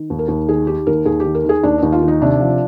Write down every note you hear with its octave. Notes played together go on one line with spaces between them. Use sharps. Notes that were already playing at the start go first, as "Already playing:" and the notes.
Already playing: D#3
D#2
A#4
D#2
D#3 G#4
D#3 G4
D#2 A#4
D#2 G#4
G4
D#3
A#4
D#3 G#4
D#2 D4
D#2 D#4
F4
D#3
D#4
C3 D4
F3